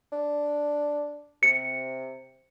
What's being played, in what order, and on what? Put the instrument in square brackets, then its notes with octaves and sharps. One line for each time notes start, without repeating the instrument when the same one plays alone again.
[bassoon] D4
[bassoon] C3 [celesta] C#7